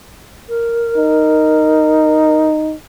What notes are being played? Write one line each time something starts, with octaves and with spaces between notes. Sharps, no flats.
A#4
D#4